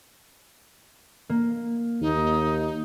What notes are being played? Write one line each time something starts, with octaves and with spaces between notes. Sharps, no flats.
A#3
D#2 D#4